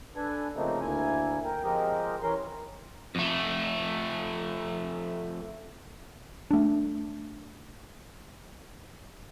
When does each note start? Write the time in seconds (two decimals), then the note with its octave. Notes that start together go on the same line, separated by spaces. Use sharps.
0.16 D4 A4 B4 G#5
0.57 C#3 F3 A3 A#3 C4 D#4
0.81 D2 A#3 E4 G#5
1.43 A#4 G5
1.64 F3 G#3 C4 G4 A#4 D#5
2.23 E3 C#4 A#4 C6
3.15 F2 A3
6.51 A3 D4